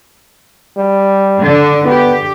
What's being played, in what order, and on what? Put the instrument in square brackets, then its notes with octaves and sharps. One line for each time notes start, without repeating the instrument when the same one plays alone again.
[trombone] G3
[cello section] D3 D4
[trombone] B3 [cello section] G4